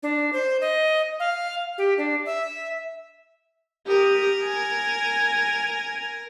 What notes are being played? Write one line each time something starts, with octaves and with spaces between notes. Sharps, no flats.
D4
C5
D#5
F5
G4
D4
E5
G4 A#4 D#6
G#5